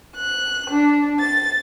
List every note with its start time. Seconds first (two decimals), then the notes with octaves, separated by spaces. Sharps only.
0.17 F#6
0.71 D4
1.20 A6